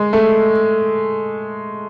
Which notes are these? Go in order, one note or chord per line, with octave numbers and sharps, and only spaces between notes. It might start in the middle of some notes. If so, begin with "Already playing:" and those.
Already playing: G#3
A3